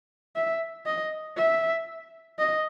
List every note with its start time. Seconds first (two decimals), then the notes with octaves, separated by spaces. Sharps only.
0.36 E5
0.86 D#5
1.37 E5
2.39 D#5